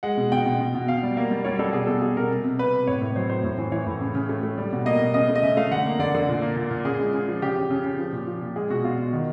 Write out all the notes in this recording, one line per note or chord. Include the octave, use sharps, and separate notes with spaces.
G#3 F#5
B2
B2 G5
B2
B2
B2
B2 F5
G3
A#3
G3
G3 C#5
G3 A4
B2 G#4
B2 A4
B2 G#4
B2 A#4
C3
C3
C3 B4
C3
A2 C#5
A2
F#3 C5
A2 C5
A2
E3
E3 C#5
A2
C#3
C#3
A3
A3
G3
B2
A#3 D#5
B2
C#3 D#5
A3
D#5
C#3 E5
A3 F5
D3 F#5
A#3
D3 D5
D3
A#2
A#3
A#2
A#2
C#3 G#4
G#3
C#3
F3
C#3 G4
C#3
C#3
C#3
F3
A#2
F3
A#2
G#3 G#4
B2 F#4
B2 F4
B2
D#3